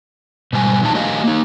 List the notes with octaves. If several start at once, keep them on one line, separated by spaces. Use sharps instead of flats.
G#2 B2 G3 G#5
A#2 E3 F#3 D#4 A4 A5
A3 F#4 G4 D#5 F5 G#5
A#3 C#4 D#4